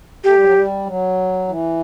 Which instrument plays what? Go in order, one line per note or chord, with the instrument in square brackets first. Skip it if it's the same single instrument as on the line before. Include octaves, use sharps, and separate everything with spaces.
[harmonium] A3 [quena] G4
[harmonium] G3
F#3
G3
F#3
E3